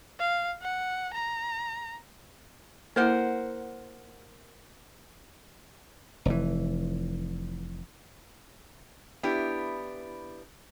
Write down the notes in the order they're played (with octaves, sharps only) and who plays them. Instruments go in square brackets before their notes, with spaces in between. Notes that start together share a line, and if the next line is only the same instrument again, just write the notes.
[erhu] F5
F#5
A#5
[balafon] A#3 E4 [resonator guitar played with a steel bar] A#4 C5 F#5
[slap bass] F1 E3
[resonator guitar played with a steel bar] B3 D4 E4 G4